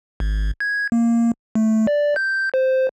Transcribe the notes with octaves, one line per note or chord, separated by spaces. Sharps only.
G#1
G#6
A#3
A3
D5
G6
C5